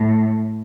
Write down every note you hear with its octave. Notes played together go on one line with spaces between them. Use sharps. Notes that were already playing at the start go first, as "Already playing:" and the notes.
Already playing: A2